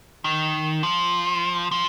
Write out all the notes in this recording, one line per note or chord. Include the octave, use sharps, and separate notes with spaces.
D#3
F3
F3